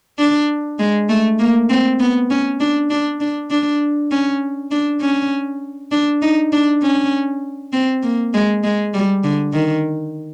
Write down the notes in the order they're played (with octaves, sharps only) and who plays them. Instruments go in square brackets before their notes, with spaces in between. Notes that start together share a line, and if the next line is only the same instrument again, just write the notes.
[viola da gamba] D4
G#3
A3
A#3
C4
B3
C#4
D4
D4
D4
D4
C#4
D4
C#4
D4
D#4
D4
C#4
C4
A#3
G#3
G#3
G3
D3
D#3